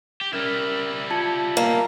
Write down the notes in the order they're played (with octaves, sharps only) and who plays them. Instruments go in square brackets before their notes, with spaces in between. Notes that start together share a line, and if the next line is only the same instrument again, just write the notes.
[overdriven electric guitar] G4
[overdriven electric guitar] G3 E4 [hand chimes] C#4 A#4 F6
[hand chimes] F4 G#6 C#7 [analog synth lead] A5
[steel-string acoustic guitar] A#3